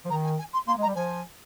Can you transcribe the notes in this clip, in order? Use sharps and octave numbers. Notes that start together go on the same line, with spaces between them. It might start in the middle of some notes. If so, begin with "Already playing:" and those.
F3
D#3 A#5
G#5
G#5
C6
A#3 C6
G#3
A#5
G3
F3 G#5